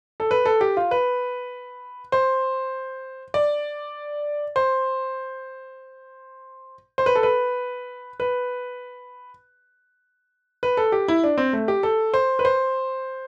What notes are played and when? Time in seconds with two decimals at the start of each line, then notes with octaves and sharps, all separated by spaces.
0.20 A4
0.31 B4
0.46 A4
0.61 G4
0.77 F4
0.91 B4
2.12 C5
3.34 D5
4.56 C5
6.98 C5
7.06 B4
7.15 A4
7.23 B4
8.20 B4
10.63 B4
10.77 A4
10.92 G4
11.08 E4
11.24 D4
11.38 C4
11.53 A3
11.68 G4
11.83 A4
12.14 C5
12.39 B4
12.45 C5